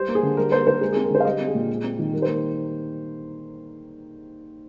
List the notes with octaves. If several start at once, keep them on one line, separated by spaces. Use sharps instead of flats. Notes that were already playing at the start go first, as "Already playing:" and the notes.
Already playing: G3 C5
A#3
G#4
D3
G3 A#4
A#3 C5
D3 C5
G#3 A#4
C4 G#4
A#4
D3 C5
F5
G3 D#5
C4
G#4
A#2
G#3
C4
D#3
G3 A#4
C5
A#3